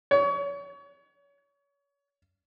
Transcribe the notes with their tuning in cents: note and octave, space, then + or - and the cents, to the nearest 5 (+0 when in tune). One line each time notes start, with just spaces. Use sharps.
C#5 +30